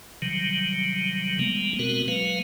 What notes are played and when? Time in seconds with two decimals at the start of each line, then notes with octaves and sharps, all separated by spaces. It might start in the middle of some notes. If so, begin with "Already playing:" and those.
0.22 C3 D#3 F#3 G3
1.39 G3 G#3 A#3 B3
1.79 B2 G#3 B3 C4 F#4 A#4
2.08 F#3 G#3 A#3 B4 F5